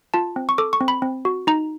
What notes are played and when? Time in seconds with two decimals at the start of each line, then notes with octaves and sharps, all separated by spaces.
0.14 F4 A5
0.36 C4
0.49 C#6
0.58 A4 D6
0.73 C#6
0.81 C4
0.88 B5
1.02 C4
1.25 F#4
1.47 D#4 A#5